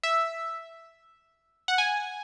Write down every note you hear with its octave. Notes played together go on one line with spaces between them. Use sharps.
E5
F#5
G#5